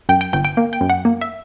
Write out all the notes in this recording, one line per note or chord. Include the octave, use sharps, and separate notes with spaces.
F#2 G5
G5
G1 G5
G5
A#3
G5
F#2
F#5
A#3
E5